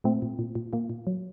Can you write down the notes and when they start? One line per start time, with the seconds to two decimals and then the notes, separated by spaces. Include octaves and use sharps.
0.04 A#2 A3 C4
0.22 A#2
0.39 A#2
0.55 A#2
0.73 A#2 A#3
0.90 A#2
1.07 F#3